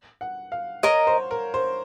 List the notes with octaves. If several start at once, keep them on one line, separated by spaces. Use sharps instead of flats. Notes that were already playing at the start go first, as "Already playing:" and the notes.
F#5
F5
A#4 C#5 D#5 A#5
C5
A#4
C5